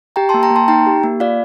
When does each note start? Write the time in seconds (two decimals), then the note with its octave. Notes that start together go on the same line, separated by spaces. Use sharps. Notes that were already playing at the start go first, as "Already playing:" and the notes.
0.16 G4 G5 A#5
0.29 A5 C6
0.34 A#3
0.43 G5 A#5
0.50 A#3
0.56 A5 C6
0.68 D#4 G5 A#5
0.87 G4
1.04 A#3
1.20 F4 D5 F5